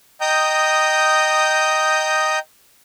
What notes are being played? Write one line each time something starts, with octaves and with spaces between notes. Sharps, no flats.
D#5 G5 A#5 D#6 G6